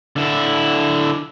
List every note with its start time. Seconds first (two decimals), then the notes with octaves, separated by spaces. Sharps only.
0.16 D3 E4